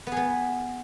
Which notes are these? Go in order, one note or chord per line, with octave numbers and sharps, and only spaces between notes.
B3
G#4
B3